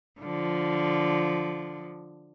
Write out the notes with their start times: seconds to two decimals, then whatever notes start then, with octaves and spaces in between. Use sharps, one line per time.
0.21 D3 F3